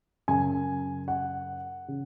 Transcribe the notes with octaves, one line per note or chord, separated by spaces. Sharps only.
F#2 C#3 G#5
F#5
C#3